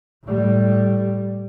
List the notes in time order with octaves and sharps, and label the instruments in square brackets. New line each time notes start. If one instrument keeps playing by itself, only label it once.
[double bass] A2 G3